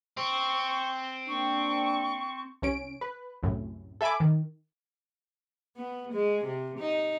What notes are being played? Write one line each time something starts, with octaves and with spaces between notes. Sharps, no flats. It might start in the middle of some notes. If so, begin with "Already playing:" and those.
C4 C#6
A#3 D4 C#6
C2 C#4 D7
B4
C2 F#2 A2
A4 E5 G#5 B5 D6
D#3
B3
G#3
C3
D#4